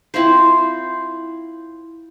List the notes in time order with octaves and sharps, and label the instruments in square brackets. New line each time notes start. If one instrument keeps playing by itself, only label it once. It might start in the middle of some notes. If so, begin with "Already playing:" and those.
[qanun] C4 E4 F4 C5